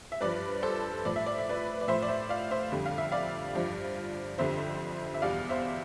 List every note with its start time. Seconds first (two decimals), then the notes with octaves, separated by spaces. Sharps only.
0.12 E5
0.21 G2 F3 B4 D5
0.62 A4 C5
1.05 A2 F3 D5
1.16 E5
1.26 D5
1.38 E5
1.49 B4 D5
1.81 D5
1.88 A2 F3 C5 E5
2.02 D5
2.08 C5 E5
2.29 D5 F5
2.51 C5 E5
2.72 F2 D3 G3
2.86 F5
2.98 E5
3.12 D5 F5
3.55 G2 F3
4.38 F2 D3 G3 C5 E5
5.14 E5
5.22 E2 B2 G3 D5 F5
5.49 C5 E5